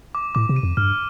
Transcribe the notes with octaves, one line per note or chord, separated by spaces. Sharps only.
D6
A2 D6
C3
D#7
F2
G2 F6